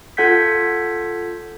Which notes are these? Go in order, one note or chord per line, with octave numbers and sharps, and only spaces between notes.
F4 A4 F#5 G6 G#6 B6